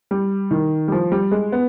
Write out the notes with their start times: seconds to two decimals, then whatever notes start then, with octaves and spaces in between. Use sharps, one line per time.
0.11 G3
0.51 D#3
0.88 G3
0.92 F3
1.12 G3
1.32 G#3
1.52 B3